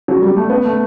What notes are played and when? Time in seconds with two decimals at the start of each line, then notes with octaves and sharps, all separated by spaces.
0.08 F#3
0.22 G3
0.36 A3
0.50 B3
0.65 A3